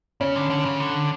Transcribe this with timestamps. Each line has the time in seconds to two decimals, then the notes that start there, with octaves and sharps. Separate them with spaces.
0.21 C#3 C#4
0.36 D3
0.50 D3
0.65 C#3
0.80 D3